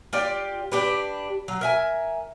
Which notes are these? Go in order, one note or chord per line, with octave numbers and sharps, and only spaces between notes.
F4 G4 D5
D4 G4 B4
F#3
A#4 E5 G#5